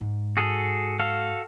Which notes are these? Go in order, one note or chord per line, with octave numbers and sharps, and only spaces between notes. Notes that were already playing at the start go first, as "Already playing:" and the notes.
G#2
F#4 G#4 A4
F#4 A4 F5